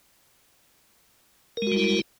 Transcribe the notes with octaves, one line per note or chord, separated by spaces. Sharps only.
G3 G#3 E4 F#4 A#4